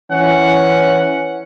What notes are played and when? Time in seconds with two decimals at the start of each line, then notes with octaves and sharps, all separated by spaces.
0.11 E3 C#4 F#5